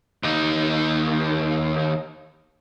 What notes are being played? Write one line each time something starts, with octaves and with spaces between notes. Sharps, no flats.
D#2 D#4